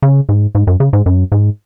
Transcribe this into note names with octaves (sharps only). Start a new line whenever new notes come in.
C#3
G#2
G#2
F#2
C#3
G#2
F#2
G#2